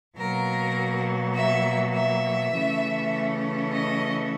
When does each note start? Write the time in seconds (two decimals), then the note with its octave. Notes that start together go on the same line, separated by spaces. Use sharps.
0.17 B2 F#3 A#3 A#4
1.35 E5
1.94 E5
2.53 C#3 E3 A3 C#4
3.71 D#5